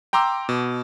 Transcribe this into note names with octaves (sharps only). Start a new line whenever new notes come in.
G5 A#5 C6 D6 E6
B2